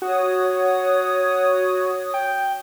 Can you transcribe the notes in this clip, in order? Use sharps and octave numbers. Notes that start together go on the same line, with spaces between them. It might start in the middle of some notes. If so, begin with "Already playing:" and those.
F#4 C#5 D#6
G5